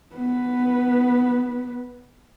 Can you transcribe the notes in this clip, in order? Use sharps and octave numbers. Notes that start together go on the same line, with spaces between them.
B3 B4